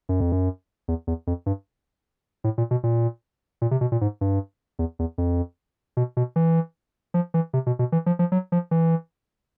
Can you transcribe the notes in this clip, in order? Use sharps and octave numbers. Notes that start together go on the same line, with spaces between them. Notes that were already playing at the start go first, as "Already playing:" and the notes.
F#2
F2
F#2
E2
E2
F2
G2
A2
A#2
B2
A#2
A#2
C3
B2
A#2
G#2
G2
E2
E2
F2
B2
B2
E3
F3
E3
C3
B2
B2
E3
F3
F3
F#3
F3
E3